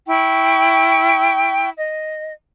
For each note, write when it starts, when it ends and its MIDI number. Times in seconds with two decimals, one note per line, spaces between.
0.08 1.69 64
0.08 1.69 79
0.08 1.69 85
1.77 2.32 75